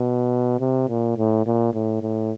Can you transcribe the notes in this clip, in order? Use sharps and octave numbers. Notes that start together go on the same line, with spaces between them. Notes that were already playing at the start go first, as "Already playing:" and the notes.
Already playing: B2
C3
A#2
A2
A#2
A2
A2